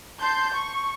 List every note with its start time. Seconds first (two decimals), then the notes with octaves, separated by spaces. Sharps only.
0.21 A5 C6 G6
0.54 C#6